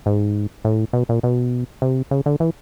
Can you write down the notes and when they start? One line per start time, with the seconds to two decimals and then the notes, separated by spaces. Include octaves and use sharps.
0.06 G#2
0.65 A2
0.93 B2
1.09 A#2
1.23 B2
1.82 C3
2.11 C#3
2.26 D3
2.40 E3